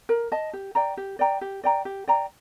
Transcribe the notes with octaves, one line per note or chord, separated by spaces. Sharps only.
A#4
D#5 A5
G4
D5 G5 A#5
G4
D5 G5 A#5
G4
D5 G5 A#5
G4
D5 G5 A#5